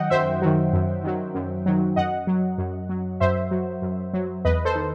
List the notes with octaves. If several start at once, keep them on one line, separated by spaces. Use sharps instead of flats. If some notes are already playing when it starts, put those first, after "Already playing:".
Already playing: D#3 F#3 D#5 F#5 G5
F#2 C5 E5
D#3 F#3
F#2
D#3 F#3
F#2
D#3 F#3
F#2 D#5 F#5
F#3
F#2
F#3
F#2 C5 E5
F#3
F#2
F#3
E2 B4 D#5
A4 C5
D#3